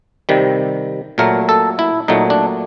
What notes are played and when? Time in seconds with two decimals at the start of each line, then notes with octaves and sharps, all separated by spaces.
0.29 C3 D#3 G3
1.18 A#2 F#3 A3 A#4
1.49 A4
1.79 E4
2.08 A#2 F#3 A3 D#4
2.30 D4